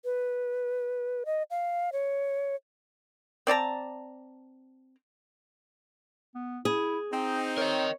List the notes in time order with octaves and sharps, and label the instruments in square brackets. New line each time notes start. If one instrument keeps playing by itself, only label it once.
[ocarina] B4
D#5
F5
C#5
[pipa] C4 D5 A5 A#5
[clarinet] B3
[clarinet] E4 [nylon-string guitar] G#4
[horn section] C4 D#4 [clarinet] G5
[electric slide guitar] A#4 D#5 [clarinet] C#5